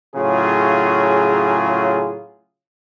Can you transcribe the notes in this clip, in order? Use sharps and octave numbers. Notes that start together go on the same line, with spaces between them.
A2 C#3 F#3 F4 G#4